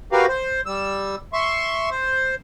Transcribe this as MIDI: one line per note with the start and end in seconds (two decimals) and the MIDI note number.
0.12 0.26 66
0.12 0.26 67
0.12 0.26 70
0.12 0.26 71
0.12 0.26 77
0.28 0.61 72
0.66 1.16 55
0.66 1.16 88
1.33 1.90 76
1.33 1.90 84
1.33 1.90 85
1.91 2.35 72